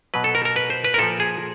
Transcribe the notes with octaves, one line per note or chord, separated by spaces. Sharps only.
B2 F#3 B4
A4
A#4
A#4
B4
C5
B4
A#4
A#2 F3 A4
G#4